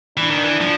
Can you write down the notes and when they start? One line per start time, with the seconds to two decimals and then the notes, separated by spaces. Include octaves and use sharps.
0.17 E3 D4
0.30 D#3
0.44 E3
0.61 F3